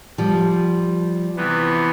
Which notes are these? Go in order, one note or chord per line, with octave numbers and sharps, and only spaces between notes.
F3 G3
C3 E3 B3